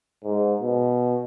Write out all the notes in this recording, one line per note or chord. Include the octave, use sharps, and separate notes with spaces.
G#2
B2